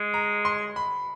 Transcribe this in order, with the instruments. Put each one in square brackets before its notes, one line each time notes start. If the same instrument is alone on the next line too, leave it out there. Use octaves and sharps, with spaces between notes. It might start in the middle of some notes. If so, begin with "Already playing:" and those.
Already playing: [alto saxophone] G#3
[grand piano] A#5
C6
B5